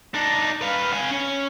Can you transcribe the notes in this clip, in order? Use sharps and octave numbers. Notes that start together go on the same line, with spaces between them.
D4 D#4
B4 F5
F5 G#5
C#4